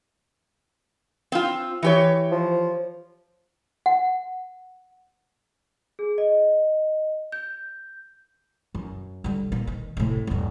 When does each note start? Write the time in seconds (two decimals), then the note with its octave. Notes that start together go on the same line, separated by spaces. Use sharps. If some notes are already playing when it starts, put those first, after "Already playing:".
1.32 C4 F4
1.83 E3 G4 C#5
2.31 F3
3.86 F#5
5.99 G#4
6.18 D#5
7.32 G6
8.75 F#2
9.24 D3 G3
9.52 A#2
9.67 D#3
9.97 A2 C3
10.27 D#1 G2